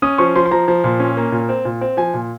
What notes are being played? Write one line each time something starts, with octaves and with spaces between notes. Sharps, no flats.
C#4 D#6
F3 C#6
F3 C6
C6
F3 A#5
F3
A#2
C#4
A#3
A#2
C4
A#2
C4
F3 G#5
A#2